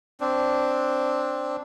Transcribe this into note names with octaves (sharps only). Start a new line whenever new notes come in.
C4 D4